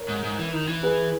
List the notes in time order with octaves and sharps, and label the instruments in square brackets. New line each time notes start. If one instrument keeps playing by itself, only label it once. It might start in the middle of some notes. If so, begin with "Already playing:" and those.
Already playing: [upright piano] A#4 C#5
[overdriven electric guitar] G#2
G#2
E3
D#3
E3
[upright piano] G#4 B4